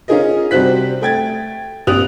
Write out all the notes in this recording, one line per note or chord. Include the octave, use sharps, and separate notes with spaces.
C#4 F4 G#4 A#4 D#5
C3 G3 F#4 C5 F#6 B6
A3 G5 G#6 A6
A#1 C4 G4 D#6 F#6 F7